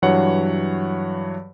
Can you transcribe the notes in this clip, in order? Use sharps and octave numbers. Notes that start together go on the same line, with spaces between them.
G2 E3 F#3 C#5 F#5